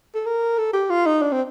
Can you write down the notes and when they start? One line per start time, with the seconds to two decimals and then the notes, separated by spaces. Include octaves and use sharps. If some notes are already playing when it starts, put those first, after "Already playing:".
0.15 A4
0.26 A#4
0.58 A4
0.73 G4
0.90 F4
1.06 D#4
1.22 D4
1.32 C4